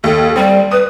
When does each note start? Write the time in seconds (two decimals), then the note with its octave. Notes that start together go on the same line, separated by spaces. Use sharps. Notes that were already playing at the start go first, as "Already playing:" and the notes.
0.04 D#2 A4
0.36 G3 C4
0.72 B4 D#6